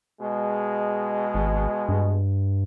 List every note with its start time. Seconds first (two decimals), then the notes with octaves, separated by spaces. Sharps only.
0.21 B2 G#3
1.34 G#1
1.89 G2